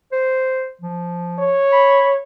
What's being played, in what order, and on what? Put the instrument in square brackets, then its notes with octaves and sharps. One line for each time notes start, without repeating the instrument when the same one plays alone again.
[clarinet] C5
F3
[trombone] C#5
[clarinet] B5